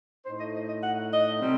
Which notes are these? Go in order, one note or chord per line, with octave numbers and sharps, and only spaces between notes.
A2 A3 D#4 C5
D#5
D#5
D#5
F#5
D#5
C3 G3 C4